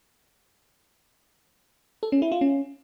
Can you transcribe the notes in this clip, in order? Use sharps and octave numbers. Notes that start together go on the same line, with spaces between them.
A4
C#4
E4
F4
C#4